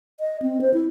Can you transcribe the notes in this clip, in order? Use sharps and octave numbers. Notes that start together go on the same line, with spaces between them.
D#5
C4
C5
E4